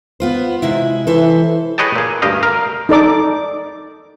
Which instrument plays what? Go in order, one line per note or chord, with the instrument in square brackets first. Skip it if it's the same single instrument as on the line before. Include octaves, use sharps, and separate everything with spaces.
[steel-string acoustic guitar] B3 F4 C5
C3 G#3 E4
[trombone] E3 [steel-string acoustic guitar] A4 C5 E5
[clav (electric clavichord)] G#4 B4 C#5 D#5 G5 A5
A#2 G#4
D2 G2 G4 D#5 F5
A#4 F5
[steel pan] D#4 A4 D5 D6